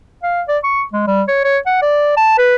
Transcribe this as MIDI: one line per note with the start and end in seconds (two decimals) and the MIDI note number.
0.23 0.42 77
0.48 0.58 74
0.64 0.83 85
0.93 1.02 56
1.07 1.22 55
1.28 1.44 73
1.44 1.58 73
1.66 1.78 78
1.82 2.14 74
2.17 2.35 81
2.38 2.56 71